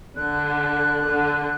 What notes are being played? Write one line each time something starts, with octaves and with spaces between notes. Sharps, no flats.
D3 F#6
D3